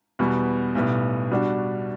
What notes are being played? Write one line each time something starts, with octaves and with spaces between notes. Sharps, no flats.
E2 B2 G3 B3
B1 A2 G3 B3
B2 G3 D4 F#4